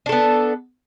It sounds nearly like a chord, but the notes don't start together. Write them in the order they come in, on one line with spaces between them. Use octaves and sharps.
D4 A4 B3